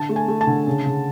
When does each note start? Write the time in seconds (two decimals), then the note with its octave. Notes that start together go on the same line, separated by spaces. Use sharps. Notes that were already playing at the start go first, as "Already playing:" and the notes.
Already playing: D3 A5
0.09 A3
0.16 G#5
0.28 A3
0.41 A5
0.47 D3
0.67 C#3
0.86 C#3